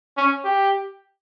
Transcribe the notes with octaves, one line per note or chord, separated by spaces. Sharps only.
C#4
G4